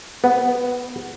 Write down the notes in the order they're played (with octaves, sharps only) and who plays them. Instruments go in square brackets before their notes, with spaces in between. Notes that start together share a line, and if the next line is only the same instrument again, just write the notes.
[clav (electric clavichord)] B3